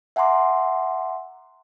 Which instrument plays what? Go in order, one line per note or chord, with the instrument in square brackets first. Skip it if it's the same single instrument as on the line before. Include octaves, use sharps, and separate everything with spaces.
[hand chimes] E5 F#5 G#5 A#5 C6 D6